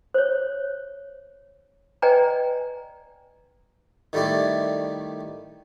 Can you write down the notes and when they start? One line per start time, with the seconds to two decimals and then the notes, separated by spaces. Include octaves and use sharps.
0.14 C5 C#5
2.02 B4 D5 D#5 G5 G#5 A#5
4.13 D#3 G3 A3 E4 D5